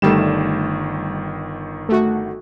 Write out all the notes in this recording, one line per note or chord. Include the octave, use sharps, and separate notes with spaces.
G1 D#3 G3 A3 E7
A3 F#4